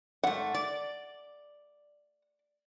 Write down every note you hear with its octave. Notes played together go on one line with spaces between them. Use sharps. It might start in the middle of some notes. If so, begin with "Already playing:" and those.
G#2 A3 F#5
D5